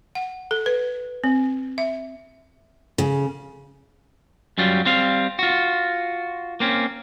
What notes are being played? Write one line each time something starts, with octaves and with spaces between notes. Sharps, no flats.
F#5
A4
B4
C4
E5
C#3
F#2 F#3 G3 F4
G3 C4 F5
F4 F#4
A#3 C4 C#4